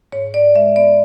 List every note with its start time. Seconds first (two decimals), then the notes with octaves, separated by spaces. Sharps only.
0.12 G#2 C#5
0.34 G#2 D5
0.55 G#3 E5
0.76 B3 D5